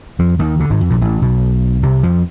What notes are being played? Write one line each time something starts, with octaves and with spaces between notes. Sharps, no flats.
F2 F3
D#2 D#3
D2 D3
G#1 G#2
F2
A#1 A#2
A1 A2
B1 B2
C2 C3
F2 F3